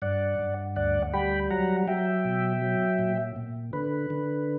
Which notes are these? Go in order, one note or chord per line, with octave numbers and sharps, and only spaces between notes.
G2 D5 F#5
G2
D2 D5 F#5
G3 G5 B5
F#3 F#5 A#5
F#3 E5 G5
B2
F#3
A#2
A#2
D3 B4
D3